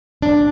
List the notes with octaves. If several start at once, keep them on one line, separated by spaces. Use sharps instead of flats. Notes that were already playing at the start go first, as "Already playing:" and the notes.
D4